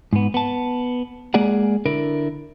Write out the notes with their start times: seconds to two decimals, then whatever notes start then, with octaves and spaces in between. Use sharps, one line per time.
0.13 G#2 B3
0.34 B3 A5
1.34 G#3 A#3 G#4 D5 F#5
1.86 D3 E4 A#4